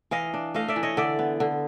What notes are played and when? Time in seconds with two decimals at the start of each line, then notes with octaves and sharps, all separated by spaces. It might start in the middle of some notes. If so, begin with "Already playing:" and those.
0.11 E3 D#5 F5
0.34 D4
0.54 A3 D#5 F5
0.68 D5 E5
0.76 E3
0.83 C#5 D#5
0.97 D3 D5 E5
1.19 B3
1.40 D3